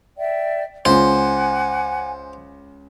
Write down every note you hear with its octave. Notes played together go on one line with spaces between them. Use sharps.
D5 E5 G5
C#2 C5 F#5 G#5 D6